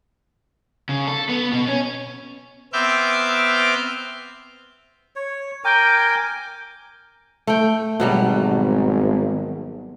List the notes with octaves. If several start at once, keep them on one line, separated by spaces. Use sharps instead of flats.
C#3
A4
B3
B2
C#4
B3 C4 E5 D6 F6 G6
C#5
A#4 G5 G#5 D6
A3 G5
G#1 B2 F#3 G3